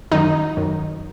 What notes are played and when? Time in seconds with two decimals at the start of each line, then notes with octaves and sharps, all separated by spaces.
0.12 F#2 D#3 F#3 D#4
0.57 F#2 D#3 F#3